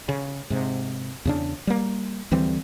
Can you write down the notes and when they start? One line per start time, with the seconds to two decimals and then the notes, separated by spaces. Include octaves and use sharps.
0.09 C#3
0.50 G#2 C3
1.25 E2 C#3 D4
1.67 G3 A#3
2.31 D2 E3 G3 C4